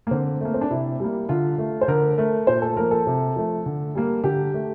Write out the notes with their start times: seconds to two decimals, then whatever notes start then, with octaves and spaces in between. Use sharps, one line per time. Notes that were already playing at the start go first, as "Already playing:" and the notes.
0.07 A#3
0.11 D3 C4
0.41 A3 A#3
0.54 C4
0.61 D4
0.70 C3 E4
1.00 G3 A#3
1.29 D3 F4
1.58 A3
1.81 C5
1.88 D3 A#4
2.18 A3 A#4
2.47 A#2 C5
2.62 A4
2.76 F3 A#3 A#4
2.91 A4
3.07 C3
3.36 F3 A3
3.66 D3
3.95 G3 A#3
4.24 D3 G4
4.54 A3